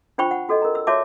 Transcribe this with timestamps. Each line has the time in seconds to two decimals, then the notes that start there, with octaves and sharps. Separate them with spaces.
0.18 D4 F4 C5 G5 B5 C#6
0.31 F#5
0.49 F#4 A4 D5 D#5
0.62 A#4 A#5
0.75 E6
0.87 F#4 C#5 D5 E5 A5 D6